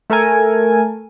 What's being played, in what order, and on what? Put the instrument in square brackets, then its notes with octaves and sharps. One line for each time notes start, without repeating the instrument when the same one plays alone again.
[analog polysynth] A3 A4 A#4 G#5